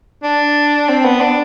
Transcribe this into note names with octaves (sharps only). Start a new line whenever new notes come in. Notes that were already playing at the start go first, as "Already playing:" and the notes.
D4
C4
B3
D4